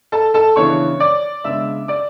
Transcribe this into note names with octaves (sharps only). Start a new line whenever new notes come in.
A4 A5
A4 A5
C#3 E3 B3 D4 C#5 C#6
D5 D6
C#3 G#3 B3 D4 E5 E6
D5 D6